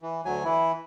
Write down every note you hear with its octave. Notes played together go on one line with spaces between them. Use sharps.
E3
D2 F#3 G#5
E3 E4